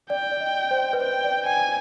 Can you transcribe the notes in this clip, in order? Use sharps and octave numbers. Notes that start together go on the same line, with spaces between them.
D5 G5
D5
D#5
C5
B4
C5 G5
D5
G5 G#5